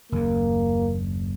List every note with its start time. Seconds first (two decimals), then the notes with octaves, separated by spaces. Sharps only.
0.12 F#1 D#2 A#3